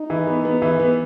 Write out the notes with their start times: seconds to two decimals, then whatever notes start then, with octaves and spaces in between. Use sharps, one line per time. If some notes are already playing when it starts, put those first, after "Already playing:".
Already playing: D#4
0.10 E3
0.27 B3
0.45 B3
0.62 E3
0.80 B3